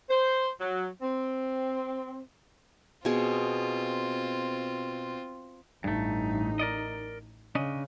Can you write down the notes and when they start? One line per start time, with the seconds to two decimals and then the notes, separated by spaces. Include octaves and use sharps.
0.10 C5
0.61 F#3
1.02 C4
3.05 B2 C4 F4 G#4
5.84 A1 G2 A3 D#4
6.59 A#4 D5 D#5
7.55 C#3 C#4 D4 D#5